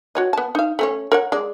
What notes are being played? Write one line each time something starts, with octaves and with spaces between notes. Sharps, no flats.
F#4 C#5 D#5
B3 A5
D#4 F5
A3 C#4 C#5
A#4 C#5 F#5
G#3 D5